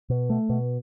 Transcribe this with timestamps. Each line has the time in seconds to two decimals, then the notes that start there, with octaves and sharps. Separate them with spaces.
0.10 B2
0.30 A3
0.50 B2